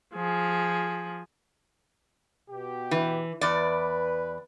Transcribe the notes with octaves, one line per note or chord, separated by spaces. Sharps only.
F3 G#4
B2 G4
E3
E2 B4 D5